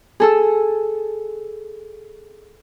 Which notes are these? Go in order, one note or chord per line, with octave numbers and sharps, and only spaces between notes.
G#4 A4 E6